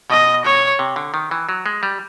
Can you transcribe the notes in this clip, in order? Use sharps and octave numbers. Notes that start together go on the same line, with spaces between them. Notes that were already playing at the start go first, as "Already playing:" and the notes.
B2 D#5
C#5
C3
D3
D#3
E3
F#3
G#3
G3